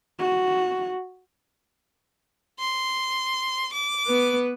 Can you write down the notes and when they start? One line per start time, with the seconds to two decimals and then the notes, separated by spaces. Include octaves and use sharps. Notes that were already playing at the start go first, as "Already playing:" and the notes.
0.19 F#4
2.59 C6
3.73 D6
4.06 B3 B4